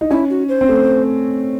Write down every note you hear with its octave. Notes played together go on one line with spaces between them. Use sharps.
D#4
C#4 E4
F#4
C5
C4
A3